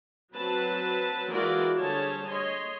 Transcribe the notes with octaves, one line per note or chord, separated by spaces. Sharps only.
F#3 C4 B4 A5
E3 G#3 F4 F#4 A#4 D5
D3 G3 G#4 C5 C#5 A5
C#5 D#5 C6